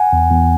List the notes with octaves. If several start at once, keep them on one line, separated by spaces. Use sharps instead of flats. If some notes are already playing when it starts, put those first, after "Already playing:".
Already playing: F#5 G#5
E2
E2